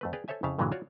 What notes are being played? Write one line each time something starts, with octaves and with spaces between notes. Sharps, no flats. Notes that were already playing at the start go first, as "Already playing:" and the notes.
F2 A3 B4
G#4 B4 D5 F5 G5
A4 C5 C#5 E5 G#5
F2 C#3 E4 F5 A5
G2 A#2 D3 E3 F#3 G#3
F4 F#4 C#5 D5